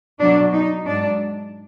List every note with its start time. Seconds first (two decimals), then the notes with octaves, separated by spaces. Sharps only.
0.21 B2 F#3 D4
0.54 D#4
0.85 G#2 F#3 D4